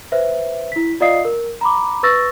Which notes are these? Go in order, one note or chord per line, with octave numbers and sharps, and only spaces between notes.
B4 C5 E5
E4 B6
F4 D5 D#5 F5 D#6 C7
A#4
A#5 B5 D6
B4 C#6 E6 A6 A#6